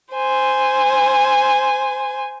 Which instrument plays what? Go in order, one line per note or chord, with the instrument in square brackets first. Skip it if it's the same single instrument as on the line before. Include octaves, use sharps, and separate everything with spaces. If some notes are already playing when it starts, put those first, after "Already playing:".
[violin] C5 G#5